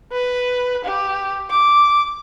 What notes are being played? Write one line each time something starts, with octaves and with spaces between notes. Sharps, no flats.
B4
G4
D6